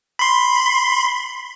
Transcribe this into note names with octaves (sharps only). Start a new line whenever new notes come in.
B5 C6